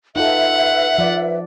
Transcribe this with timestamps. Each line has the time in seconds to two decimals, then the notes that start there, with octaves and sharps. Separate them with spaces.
0.16 D#4 F4 A4 B4 E5 F#5
0.98 F3 D5